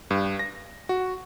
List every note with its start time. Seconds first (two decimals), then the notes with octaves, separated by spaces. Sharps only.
0.11 G2
0.39 A#6
0.89 F#4